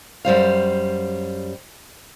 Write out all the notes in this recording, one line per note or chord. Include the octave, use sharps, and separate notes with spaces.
F#2 G3 C5 F5